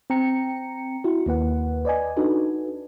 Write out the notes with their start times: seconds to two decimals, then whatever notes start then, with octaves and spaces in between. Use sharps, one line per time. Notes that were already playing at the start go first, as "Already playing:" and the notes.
0.10 C4 G5 A#5 C#7
1.04 E4 F#4
1.26 D#2 A#3 B4 F#5
1.85 B4 D5 D#5 G#5
2.17 D4 D#4 F#4 A4 B4